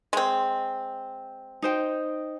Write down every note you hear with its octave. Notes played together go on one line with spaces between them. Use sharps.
G#3 C4
D#4 C5 G5